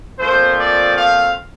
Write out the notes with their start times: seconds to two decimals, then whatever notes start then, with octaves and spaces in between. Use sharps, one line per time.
0.19 A#2 F3 A3 C4 C5
0.58 D5
0.96 F5